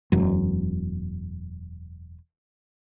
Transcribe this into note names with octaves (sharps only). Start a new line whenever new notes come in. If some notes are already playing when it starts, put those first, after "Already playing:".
E1 F#2